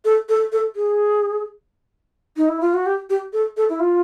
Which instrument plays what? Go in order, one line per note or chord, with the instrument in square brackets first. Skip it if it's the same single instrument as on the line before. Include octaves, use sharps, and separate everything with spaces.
[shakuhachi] A4
A4
A4
G#4
D#4
E4
F4
F#4
G4
G4
A4
A4
E4
F4